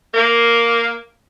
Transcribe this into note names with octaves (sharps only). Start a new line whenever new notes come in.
A#3